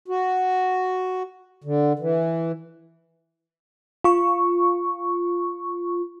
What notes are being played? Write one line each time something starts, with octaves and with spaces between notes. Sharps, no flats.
F#4
D3
E3
F4 C#6